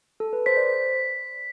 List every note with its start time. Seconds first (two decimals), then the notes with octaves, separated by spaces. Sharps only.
0.20 A4
0.33 B4
0.46 C5 B6
0.57 D5
0.62 C5